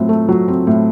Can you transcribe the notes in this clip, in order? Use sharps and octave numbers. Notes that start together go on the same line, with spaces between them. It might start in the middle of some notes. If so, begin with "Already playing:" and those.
Already playing: A2 F#3 C4
A3
F#3
C4
A2